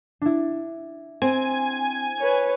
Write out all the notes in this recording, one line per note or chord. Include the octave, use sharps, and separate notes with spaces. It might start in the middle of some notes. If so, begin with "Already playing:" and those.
D4 E4
C4 C5 G#5
B4 C#5